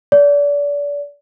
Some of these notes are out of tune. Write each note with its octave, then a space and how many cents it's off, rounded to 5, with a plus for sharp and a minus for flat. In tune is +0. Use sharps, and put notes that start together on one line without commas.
D5 -30